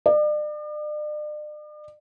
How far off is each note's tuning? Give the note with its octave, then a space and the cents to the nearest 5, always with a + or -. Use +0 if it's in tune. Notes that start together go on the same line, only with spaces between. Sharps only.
D5 +40